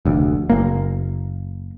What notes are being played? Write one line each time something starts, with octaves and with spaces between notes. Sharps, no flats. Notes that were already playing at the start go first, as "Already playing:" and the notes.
F1 D2
F#1 A#3